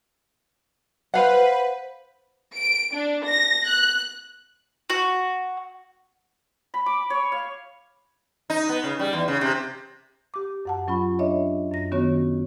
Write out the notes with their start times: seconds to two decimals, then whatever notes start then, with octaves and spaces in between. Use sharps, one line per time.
1.14 B4 C5 F5 F#5
2.55 D7
2.94 D4
3.26 A#6
3.69 F#6
4.90 F#4
6.74 B5
6.86 D6
7.10 C#5
7.32 F5
8.50 D#4
8.69 B3
8.84 C#3
8.99 G3
9.13 E2
9.28 C#3
9.41 C3
10.34 G4 D6
10.65 F#2 F#5 A5
10.88 F#3 C#4 F4 B5
11.19 D4 C#5 D#5 E5
11.71 F#2 A#6
11.92 D#3 B3 C#4 F#4 C#5